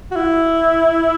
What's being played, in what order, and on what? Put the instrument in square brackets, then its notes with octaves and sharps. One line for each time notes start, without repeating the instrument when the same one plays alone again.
[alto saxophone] F#4
E4